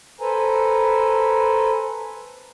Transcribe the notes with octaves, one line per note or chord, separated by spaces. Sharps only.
A4 B4 C5 G#5 A#5